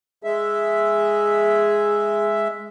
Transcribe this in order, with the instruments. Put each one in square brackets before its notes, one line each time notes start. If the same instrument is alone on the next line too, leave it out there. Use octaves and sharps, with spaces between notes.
[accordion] G#3 E5 [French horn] G#4